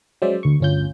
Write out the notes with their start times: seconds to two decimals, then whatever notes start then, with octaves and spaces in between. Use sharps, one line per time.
0.22 F#3 G#3 C#4 C5 D5 E5
0.43 D2 C#6
0.60 G1 D2 C#4 F4 G6